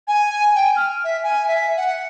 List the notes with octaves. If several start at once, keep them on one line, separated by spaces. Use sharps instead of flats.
G#5
G5
F6
E5
G#5
E5
F#5